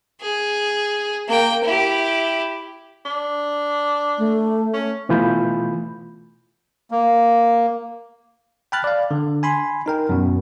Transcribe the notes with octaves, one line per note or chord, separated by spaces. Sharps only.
G#4
A#3 G5
E4 G4
D4
A3
C#4
B2 E3 A3 F4 B5 G6
A#3
G5 A5 B5 F6 F#6 A6
D5 F5
D3
G#5 B5 C6
D#4 A#4 G5
F#2 B2